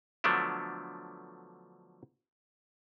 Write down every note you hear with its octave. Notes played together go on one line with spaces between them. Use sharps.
D3 F3 F#3 A3 B3 D4